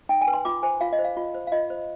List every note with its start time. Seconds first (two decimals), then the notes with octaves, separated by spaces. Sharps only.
0.09 D#4 G5
0.21 G#5
0.28 B4
0.33 C6
0.45 F4 D6
0.63 C5 G#5
0.81 F4 F5
0.93 D#5
0.99 C5
1.04 F5
1.17 F4
1.35 C5
1.47 F5
1.52 F4 D#5
1.70 C5